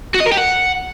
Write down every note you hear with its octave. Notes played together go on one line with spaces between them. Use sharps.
F#4
D#5
A#4
G4
F#5